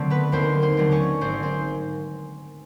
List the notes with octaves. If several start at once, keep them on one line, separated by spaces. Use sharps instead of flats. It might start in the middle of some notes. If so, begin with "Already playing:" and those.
Already playing: D3 F#3 A3 C4
B3 B4
D#2 C4 C5
C4 C5
D3 F#3 A3 C4
C#4 C#5
G#1 C4 C5
C4 C5